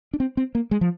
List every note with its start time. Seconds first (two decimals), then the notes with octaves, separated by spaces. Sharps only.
0.14 D4
0.20 C4
0.37 C4
0.55 A#3
0.71 G#3
0.81 F3